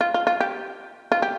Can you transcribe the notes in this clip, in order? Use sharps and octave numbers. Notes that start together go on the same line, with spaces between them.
F4
F4
F4
G4
F4
G4